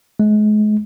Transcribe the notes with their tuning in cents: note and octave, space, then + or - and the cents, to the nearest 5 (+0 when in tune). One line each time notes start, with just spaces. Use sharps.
G#3 +35